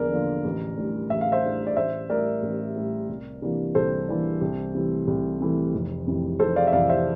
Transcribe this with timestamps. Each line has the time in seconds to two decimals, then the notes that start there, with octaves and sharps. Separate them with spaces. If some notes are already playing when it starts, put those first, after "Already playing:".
Already playing: E2 D3 F3 A#3 D4 A#4 D5
0.11 D3 F3 A#3 D4
0.45 A1
0.77 A2 G3 D4
1.10 A1 E5
1.21 F5
1.32 C5 E5
1.44 A2 G3 D4
1.67 D5
1.76 A1 C5 E5
2.10 A2 G3 A#4 D5
2.43 A1
2.76 A2 G3
3.09 C2
3.42 C3 E3 A#3 D4
3.75 C2 A4 C5
4.08 C3 E3 A#3 D4
4.41 C2
4.74 C3 E3 A3
5.07 C2
5.40 C3 E3 A3
5.74 F1
6.07 F2 C3 E3
6.39 F1 A4 C5
6.56 D5 F5
6.67 E5
6.72 F2 C3 E3 D5 F5
6.89 C5 E5